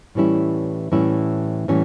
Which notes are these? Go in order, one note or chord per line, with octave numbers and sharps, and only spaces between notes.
A2 E3 G3 C#4 E4
A2 E3 G3 C#4 E4
A2 E3 G3 C#4